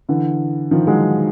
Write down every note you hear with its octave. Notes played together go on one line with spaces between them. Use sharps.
D3 E3
D#3 F3
F#3 G#3